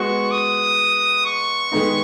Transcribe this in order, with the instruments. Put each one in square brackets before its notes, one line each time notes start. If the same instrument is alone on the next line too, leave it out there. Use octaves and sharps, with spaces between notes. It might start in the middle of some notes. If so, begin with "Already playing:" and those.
Already playing: [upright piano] G#3 B3 F#4 [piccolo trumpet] C#6
[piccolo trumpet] D#6
C#6
[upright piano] D#3 G#3 B3 D#4